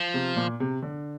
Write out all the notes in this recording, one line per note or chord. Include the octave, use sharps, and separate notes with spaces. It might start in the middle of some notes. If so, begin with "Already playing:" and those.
Already playing: F3
C3
A#2
C3
D3